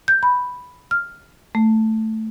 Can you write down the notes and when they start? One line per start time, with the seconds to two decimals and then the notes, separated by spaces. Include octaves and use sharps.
0.08 G6
0.23 B5
0.91 F6
1.55 A3